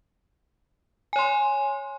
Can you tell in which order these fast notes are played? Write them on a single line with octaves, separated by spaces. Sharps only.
G#5 C#5 C6